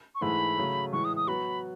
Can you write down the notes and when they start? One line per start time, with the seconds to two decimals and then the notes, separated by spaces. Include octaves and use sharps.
0.15 C#6
0.21 G#2 E3 A3 E4 G#4 B5
0.57 C#3 F#3 A3
0.92 A2 E3 G#3 C#6
1.05 D#6
1.16 D#6
1.27 F#3 B3 F#4 B5